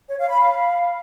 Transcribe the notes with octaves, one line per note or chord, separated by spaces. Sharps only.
C#5
F5
B5
F5